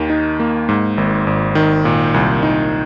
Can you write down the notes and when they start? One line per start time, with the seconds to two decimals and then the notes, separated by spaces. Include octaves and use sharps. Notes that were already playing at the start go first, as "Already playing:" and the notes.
Already playing: D#2 D#3
0.10 D#4
0.40 A#3
0.69 G#2
0.98 G#1
1.27 G#1
1.55 D#3
1.85 A#2
2.14 C2
2.43 D#4